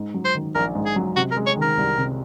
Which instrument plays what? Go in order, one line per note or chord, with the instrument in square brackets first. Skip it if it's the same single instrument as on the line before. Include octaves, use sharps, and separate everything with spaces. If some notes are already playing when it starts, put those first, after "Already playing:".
Already playing: [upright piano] G#2
F#3
[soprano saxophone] C5
[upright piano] D#3
[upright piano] A#1 [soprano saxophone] A#4
[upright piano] G#2
[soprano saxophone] G#4
[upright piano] F#3
[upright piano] C3 [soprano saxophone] F#4
[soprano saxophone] A#4
[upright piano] G#3
[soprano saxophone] C#5
[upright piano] D#3
[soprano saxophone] A#4
[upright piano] C2
C3